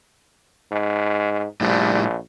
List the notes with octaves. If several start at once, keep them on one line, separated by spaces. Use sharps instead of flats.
G#2
A#1 A2 G3